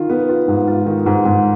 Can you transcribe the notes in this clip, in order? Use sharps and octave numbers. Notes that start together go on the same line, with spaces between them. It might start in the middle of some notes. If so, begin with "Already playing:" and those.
Already playing: D#3 F4
B3
F4
G#2
F4
D#3
G#2
G#2